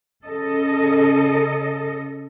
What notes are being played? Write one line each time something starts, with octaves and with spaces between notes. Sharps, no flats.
C#3 A4 D#5